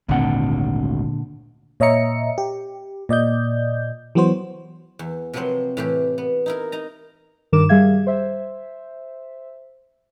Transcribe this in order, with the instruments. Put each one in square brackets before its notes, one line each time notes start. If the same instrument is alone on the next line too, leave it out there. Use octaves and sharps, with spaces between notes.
[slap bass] G#1 D2 C4 [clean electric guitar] A#2 D3 F#5
[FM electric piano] A#2 C#5 D#5 E5 A#5 C#7
G4
A#2 D5 D#5 G6
E3 F#3 B3 F#4 C5
[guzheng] E2
C3 F3 F#3 B3 C4 C6
A2 E3 G4
B3
D#4 E4 A#4
D#4 A#5
[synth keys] G2 D#3 A#4 D6 E7
G3 G#4 E5 F5 G#6
C5 E5